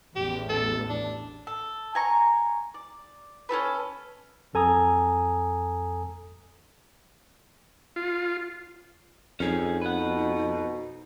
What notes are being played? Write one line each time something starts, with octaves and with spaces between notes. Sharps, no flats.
A1 E2 G4
A4
D4
A4
G#5 A#5 C#6
D5
C#4 F#4 A4 B4
A1 F2 A4 G#5 A#5 D#6
F4
F2 C#4 D#4 G#4
B2 B4 F#5